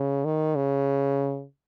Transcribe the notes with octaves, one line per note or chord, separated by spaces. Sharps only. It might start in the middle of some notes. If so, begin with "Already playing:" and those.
Already playing: C#3
D#3
C#3